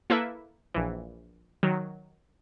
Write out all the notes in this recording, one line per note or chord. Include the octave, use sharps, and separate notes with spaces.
A#3 E4 A4 B4 E5
A#1 E3
D#3 F#3